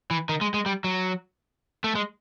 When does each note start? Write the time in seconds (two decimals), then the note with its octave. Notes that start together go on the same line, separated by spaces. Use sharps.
0.11 E3
0.29 D#3
0.41 G#3
0.54 G#3
0.66 G3
0.84 F#3
1.84 A3
1.95 G#3